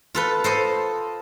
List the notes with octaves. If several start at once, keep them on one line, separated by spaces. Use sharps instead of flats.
F4 A4 B4
A4 C5 D#5